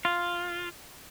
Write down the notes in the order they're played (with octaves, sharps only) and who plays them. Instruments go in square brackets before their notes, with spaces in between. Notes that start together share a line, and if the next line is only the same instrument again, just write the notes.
[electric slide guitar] F4